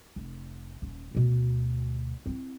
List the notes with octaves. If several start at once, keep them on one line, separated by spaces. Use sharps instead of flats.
F1
D#1 C#4
D2 B2
C4 E4